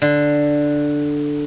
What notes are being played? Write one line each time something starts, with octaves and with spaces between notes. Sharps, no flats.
D3